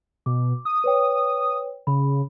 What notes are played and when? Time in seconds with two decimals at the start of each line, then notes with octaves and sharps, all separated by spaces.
0.26 B2 D6
0.65 D#6
0.84 B4 C#5 G5
1.87 C#3 B5